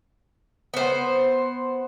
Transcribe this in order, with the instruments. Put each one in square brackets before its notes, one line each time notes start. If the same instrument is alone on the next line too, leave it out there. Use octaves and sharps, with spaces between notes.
[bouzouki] B3 C5